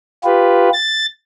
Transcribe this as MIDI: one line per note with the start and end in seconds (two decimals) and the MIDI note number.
0.24 0.69 65
0.24 0.69 67
0.24 0.69 71
0.73 1.06 93